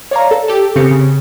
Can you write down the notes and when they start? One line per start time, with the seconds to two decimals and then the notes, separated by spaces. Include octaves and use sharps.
0.11 C#5 D5 F5 A#5
0.31 A4
0.48 G4 A4
0.76 C#3 C4 G4 C#7
0.91 C#3